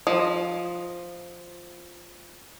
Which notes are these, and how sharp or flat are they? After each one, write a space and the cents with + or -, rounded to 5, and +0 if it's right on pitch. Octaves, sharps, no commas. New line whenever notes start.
F3 +0 D#5 +0